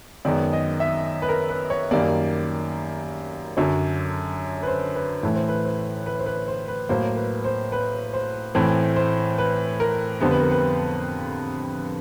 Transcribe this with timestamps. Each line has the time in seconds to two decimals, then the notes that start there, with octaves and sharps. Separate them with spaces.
0.25 F#2 D#3 G#3 B3 D5
0.53 D#5
0.80 E5
1.22 B4
1.29 A#4
1.50 B4
1.70 C#5
1.91 F#2 D#3 G3 A#3 D5
3.57 F#2 D3 F#3 C#5
4.63 B4
4.67 C5
4.95 B4
5.23 A2 E3 A3 B4
5.36 C5
5.48 B4
5.65 C5
6.06 B4
6.20 C5
6.26 B4
6.48 C5
6.68 B4
6.89 A2 F#3 A#3 C5
7.17 B4
7.45 C5
7.72 B4
8.14 C5
8.55 A2 E3 A3 C4 C5
8.96 C5
9.38 B4
9.80 A#4
10.21 F2 D3 G3 B3 C5
10.31 B4
10.41 A#4
10.51 B4